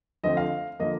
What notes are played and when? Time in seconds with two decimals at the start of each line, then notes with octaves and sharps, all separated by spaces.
0.24 F2 D3 F3 A3 C4 D#5
0.37 F5
0.79 D3 F3 A#3 D#5